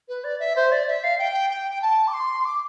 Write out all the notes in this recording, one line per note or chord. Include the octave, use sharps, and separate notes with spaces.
B4
D5
E5
C5
D5
E5
F5
G5
G5
G5
A5
D6
C6
D6